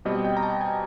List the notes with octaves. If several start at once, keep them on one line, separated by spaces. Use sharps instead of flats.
B2 G3 C4 D#5
G5
A#5
A5
G#5